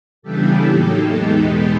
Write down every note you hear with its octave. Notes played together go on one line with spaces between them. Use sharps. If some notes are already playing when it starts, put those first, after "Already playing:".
C#3 E3 G3 B3 D4 G4 A4
A2 F#3 A#3 D#4
E2 B2 G#3 B3 D#4 G4 A4